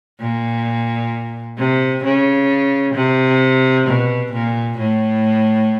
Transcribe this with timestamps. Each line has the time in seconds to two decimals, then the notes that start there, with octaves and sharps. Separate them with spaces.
0.20 A#2
1.58 C3
2.04 C#3
2.94 C3
3.86 B2
4.32 A#2
4.77 A2